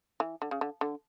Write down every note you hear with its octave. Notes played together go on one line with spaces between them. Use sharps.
E3
D3
C#3
D3
D3